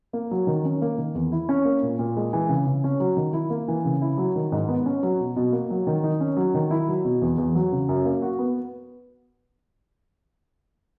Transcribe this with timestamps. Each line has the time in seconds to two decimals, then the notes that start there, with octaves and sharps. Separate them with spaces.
0.13 A#3
0.31 F#3
0.47 D#3
0.65 C#4
0.82 A#3
0.98 D#3
1.15 E2
1.32 E4
1.49 C#4
1.65 A#3
1.83 A#2
1.99 A#2
2.17 G#3
2.33 E3
2.49 C#3
2.67 C#3
2.84 C#4
3.00 F#3
3.17 D#3
3.33 E4
3.50 A#3
3.68 E3
3.85 C#3
4.02 E4
4.18 F#3
4.36 D#3
4.52 G#2
4.68 B3
4.86 C#4
5.03 F#3
5.20 B2
5.36 B2
5.52 A#3
5.70 F#3
5.87 D#3
6.04 D#4
6.20 C#4
6.37 F#3
6.54 D#3
6.71 E4
6.88 F#3
7.05 B2
7.22 E2
7.38 E2
7.55 F#3
7.72 C#3
7.89 F#2
8.05 A#3
8.22 F#4
8.39 B3